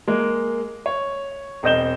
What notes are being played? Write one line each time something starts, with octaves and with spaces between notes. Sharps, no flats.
G#3 A#3
C#5
E1 C4 D#5 G6 E7 G7